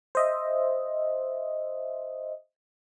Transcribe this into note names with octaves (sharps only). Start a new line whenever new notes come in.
C5 D#5 E5